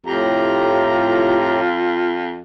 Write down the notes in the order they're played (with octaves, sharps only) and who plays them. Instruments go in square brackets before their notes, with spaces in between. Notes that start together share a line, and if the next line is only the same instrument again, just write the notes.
[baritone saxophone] F2 [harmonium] A2 G4 A#5 [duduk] F4